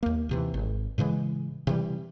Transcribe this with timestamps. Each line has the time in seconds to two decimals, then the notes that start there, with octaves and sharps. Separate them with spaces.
0.03 D#2 A#3
0.29 D#2 C3 E3
0.54 G#1
0.98 A2 C#3 E3 G#3
1.67 C3 E3 G3